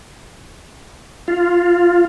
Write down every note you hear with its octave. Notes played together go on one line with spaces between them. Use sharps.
F4